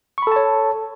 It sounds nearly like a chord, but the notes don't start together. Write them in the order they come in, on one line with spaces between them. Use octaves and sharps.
C#6 B5 A4 A5 C#5